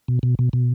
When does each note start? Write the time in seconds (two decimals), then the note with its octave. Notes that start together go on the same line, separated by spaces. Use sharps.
0.08 B2
0.23 B2
0.39 B2
0.53 B2